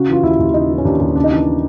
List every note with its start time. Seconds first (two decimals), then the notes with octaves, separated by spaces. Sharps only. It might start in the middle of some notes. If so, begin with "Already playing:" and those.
Already playing: C#3 F#4
0.09 E3 F4
0.23 D#2 E4
0.39 D#2
0.54 C#3 D#4
0.70 E3
0.78 C#4
0.85 D#2 D4
1.00 D#2
1.16 C#3 D4
1.24 D#4
1.32 E3 D4